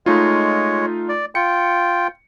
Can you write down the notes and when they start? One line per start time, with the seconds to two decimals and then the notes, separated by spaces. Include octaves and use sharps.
0.06 G#3 A3 D#4 F4 C#5
1.09 D5
1.35 F4 G5 C#7